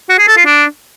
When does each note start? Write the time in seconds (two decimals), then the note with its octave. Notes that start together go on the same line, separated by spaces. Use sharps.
0.09 F#4
0.19 G#4
0.28 A4
0.37 F4
0.46 D4